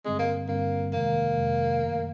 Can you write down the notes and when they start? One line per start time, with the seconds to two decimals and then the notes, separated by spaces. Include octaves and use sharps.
0.05 G2 D3 G3 G#3 C4
0.19 A#3
0.48 G2 D3 G3 A#3 C4
0.92 F2 C3 D#3 G#3 A#3
1.36 F2 C3 D#3 G#3
1.80 F#2 D#3 F#3 A3